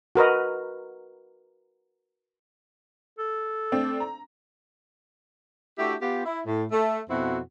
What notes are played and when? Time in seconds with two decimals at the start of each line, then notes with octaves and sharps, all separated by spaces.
0.15 F#4 A#4 B4 D#5
3.19 A4
3.72 A3 C4 D4
4.00 A#5
5.79 A3 D4 E4 F#4 G4
6.02 B3 F4 G4
6.25 E4
6.46 A2
6.71 A3
7.10 F2 B2 C4 E4 F#4 F#5